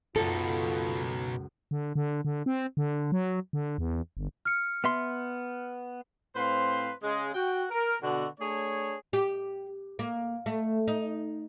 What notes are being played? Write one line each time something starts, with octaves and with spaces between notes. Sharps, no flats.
C#2 F#2 B2 D#4 F4 A4
D3
D3
D3
C4
D3
F#3
D3
E2
G1
F6 C#7
B3 E5 C6
A2 C4 B4 C5 F5 C6
C#3 G#3
F#4 G5
A#4
B2 D3 F#4
A3 D4 G#4 C#5
G4
A#3
A3
D#4